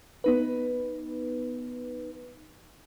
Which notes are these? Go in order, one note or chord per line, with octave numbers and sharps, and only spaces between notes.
B3 D#4 B4